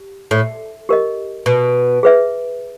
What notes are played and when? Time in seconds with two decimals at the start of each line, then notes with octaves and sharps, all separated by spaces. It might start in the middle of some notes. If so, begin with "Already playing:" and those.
Already playing: G4
0.31 A2
0.89 G4 A#4 D#5
1.46 B2
2.03 G#4 B4 E5